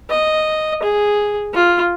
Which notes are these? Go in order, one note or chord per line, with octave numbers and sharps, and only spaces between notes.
D#5
G#4
F4